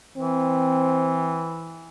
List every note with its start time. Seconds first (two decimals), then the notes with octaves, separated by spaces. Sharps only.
0.17 E3 C4